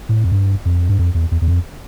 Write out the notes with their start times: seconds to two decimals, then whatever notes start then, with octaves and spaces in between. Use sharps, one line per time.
0.09 A2
0.24 F2
0.32 G2
0.65 F2
0.89 G2
0.99 F2
1.14 E2
1.31 E2
1.41 E2
1.48 F2